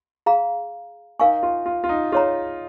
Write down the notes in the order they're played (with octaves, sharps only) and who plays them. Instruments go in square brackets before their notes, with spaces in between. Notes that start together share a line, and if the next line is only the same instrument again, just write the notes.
[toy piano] G#4 F5 A#5
[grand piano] D#4 [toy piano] A#4 F5 G#5 C#6
[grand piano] F4
F4
F4
D#4
[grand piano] F4 [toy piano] G#4 C#5 A#5